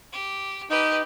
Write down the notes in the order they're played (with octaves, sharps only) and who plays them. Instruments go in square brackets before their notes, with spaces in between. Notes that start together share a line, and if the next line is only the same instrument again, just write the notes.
[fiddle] G4
[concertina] D#4 [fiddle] G4 B4